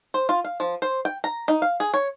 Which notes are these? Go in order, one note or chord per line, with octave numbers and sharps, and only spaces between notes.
C5
F4
F5
F3
C5
G5
A#5
D#4
F5
G#4
C#5